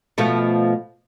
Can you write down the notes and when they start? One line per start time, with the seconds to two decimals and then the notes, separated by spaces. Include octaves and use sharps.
0.18 B2 F3 A3